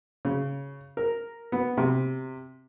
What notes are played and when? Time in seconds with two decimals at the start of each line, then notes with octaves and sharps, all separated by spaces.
0.25 C#3
0.97 A#4
1.52 B3
1.77 C3